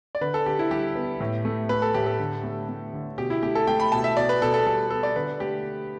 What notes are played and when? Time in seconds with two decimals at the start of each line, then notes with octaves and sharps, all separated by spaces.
0.15 D5
0.21 D3 B4
0.34 A4
0.46 D3 G4
0.59 E4
0.71 G3 G4
0.95 B3
1.20 A2
1.45 A3
1.69 A3 B4
1.82 A4
1.94 A2 G4
2.06 A4
2.19 D3
2.44 A3
2.69 A3
2.93 D3
3.18 B2 G4
3.30 E4
3.43 A3 G4
3.55 A4
3.67 A3 G5
3.80 B5
3.92 B2 A5
4.04 E5
4.17 B2 D5
4.29 B4
4.41 B2 A4
4.54 A4
4.66 G3 A4
4.90 B3 A4
5.03 D5
5.16 D3 B4
5.40 A3 G4